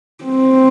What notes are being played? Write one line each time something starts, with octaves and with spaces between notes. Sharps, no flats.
C4